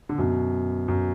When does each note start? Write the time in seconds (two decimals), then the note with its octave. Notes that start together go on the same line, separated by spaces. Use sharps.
0.09 D3
0.18 F#2 B2
0.88 F#2